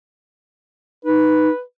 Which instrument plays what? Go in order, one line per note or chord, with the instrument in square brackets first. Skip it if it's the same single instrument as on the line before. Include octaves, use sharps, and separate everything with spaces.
[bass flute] D#4 [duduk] B4